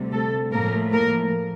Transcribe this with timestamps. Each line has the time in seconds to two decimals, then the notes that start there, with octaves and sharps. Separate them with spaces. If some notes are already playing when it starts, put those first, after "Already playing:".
Already playing: D2 C3 G3
0.12 A3 A4
0.52 A2 F3 A3 A#3 A#4
0.92 A#3 A#4